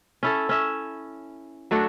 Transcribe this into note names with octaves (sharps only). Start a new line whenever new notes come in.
C#4 E4 A4
C#4 E5
F#3 A3 D4 F#4